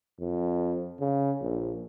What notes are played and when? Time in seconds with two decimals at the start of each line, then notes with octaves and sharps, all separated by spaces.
0.20 F2
1.00 C#3
1.42 A#1